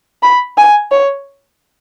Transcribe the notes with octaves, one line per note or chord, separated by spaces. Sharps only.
B5
G#5
C#5